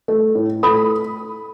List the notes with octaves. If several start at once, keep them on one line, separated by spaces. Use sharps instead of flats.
A3
A2
A3 B5 D#6